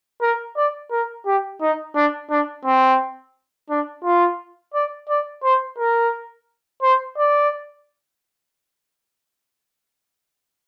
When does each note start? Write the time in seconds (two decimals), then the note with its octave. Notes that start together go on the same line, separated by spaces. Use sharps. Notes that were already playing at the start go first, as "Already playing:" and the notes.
0.22 A#4
0.57 D5
0.91 A#4
1.26 G4
1.61 D#4
1.96 D4
2.30 D4
2.65 C4
3.70 D4
4.04 F4
4.74 D5
5.09 D5
5.44 C5
5.78 A#4
6.82 C5
7.17 D5